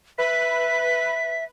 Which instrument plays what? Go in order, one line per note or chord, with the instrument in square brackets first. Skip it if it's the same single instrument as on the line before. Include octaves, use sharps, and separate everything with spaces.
[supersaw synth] B4 [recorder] E5 [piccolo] B6